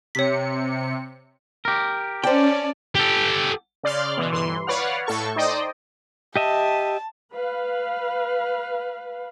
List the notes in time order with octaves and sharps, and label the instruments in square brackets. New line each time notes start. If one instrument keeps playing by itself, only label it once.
[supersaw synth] C3 C#7 [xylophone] C#5 B6
[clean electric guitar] G4 A#4
[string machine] C#4 [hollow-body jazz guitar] C5 G5 [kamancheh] D5 A5
[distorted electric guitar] G4 A4
[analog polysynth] C#3 D5 C6 F6
B2 E3
G1 E3 C6
B4 C#5 D5 F5 F#5 F6
A2 A4 C#6
D#4 C5 D5 D#5 G5 D#6
[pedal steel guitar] G4 D#5 E5 [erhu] A5
[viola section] B4 F5